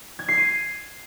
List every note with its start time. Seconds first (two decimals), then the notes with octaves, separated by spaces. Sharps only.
0.19 G#6
0.28 C7
0.38 D#7